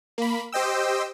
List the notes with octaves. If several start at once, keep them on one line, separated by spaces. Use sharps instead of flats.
A#3 B5
G4 C5 D#5 G5 E6